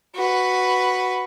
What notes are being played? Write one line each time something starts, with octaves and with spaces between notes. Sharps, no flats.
F#4 B4